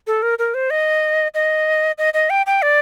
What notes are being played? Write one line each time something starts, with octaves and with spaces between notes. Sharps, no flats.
A4
A#4
A#4
C5
D#5
D#5
D#5
D#5
G5
G5
D5